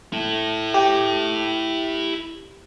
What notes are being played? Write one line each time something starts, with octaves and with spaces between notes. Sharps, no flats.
E4 A4
G4